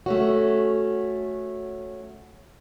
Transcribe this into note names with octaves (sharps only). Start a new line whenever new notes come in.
A3 C#4 F#4